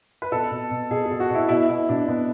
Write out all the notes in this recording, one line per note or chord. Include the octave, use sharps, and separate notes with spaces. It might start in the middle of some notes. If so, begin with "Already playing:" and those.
B4
B2 A4
B2
B2
B2 G#4
G#4
B2
F#4
B2 E4
B2 E4
B2 E4
B2 D4
B2 B3